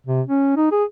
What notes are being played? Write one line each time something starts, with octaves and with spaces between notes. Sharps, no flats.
C3
C#4
D#4
G#4